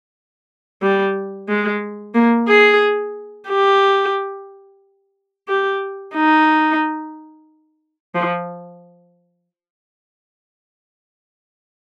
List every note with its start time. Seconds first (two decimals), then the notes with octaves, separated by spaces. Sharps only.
0.82 G3
1.49 G#3
2.15 A#3
2.48 G#4
3.49 G4
5.49 G4
6.15 D#4
8.15 F3